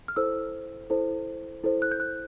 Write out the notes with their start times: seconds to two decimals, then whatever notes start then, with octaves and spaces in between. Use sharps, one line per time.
0.08 F6
0.16 E4 A4 C5 E6
0.90 E4 A4 C5
1.64 E4 A4 C5
1.82 F#6
1.91 G6
2.00 F#6